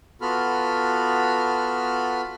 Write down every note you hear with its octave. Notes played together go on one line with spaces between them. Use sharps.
B3 F4 F#4 A4 B5 F6